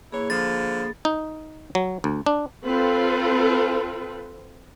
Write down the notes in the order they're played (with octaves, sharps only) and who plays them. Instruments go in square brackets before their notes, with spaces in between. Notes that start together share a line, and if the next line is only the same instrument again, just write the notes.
[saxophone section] E3 E4 C#5 [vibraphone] A#3 G#4 B5
[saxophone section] D3 F3 [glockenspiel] A6
[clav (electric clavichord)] D#4
F#3
D2
D4
[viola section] C4 F4 A4 B4